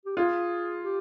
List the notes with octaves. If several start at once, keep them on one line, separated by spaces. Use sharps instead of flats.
G4
F4 G#4
G4